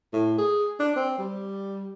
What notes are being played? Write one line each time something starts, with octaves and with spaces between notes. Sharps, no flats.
A2
G#4
D4
C4
G3